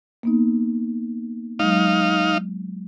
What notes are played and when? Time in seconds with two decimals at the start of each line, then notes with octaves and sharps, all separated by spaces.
0.23 A#3 B3 D#4
1.59 F#3 G#3 D#4 F5